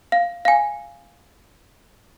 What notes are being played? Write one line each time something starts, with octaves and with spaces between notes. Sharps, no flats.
F5
F5 G#5